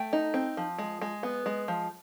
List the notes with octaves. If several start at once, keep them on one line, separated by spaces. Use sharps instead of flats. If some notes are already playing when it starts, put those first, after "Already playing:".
Already playing: A3 G5
D#4
C4
F3
G#3
G#3
B3
G#3
F3